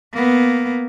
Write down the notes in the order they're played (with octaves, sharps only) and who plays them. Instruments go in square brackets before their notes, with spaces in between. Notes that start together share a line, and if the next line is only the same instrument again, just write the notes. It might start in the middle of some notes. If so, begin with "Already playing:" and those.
[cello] A#3 B3